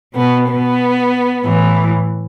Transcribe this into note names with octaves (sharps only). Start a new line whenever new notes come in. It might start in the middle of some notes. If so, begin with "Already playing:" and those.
B2 B3
B3
A2 E3